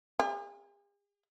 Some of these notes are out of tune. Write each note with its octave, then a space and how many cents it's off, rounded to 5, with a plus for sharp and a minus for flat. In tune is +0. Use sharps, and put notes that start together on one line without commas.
G#4 -45